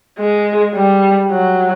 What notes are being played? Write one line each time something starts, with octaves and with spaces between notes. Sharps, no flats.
G#3
G3
F#3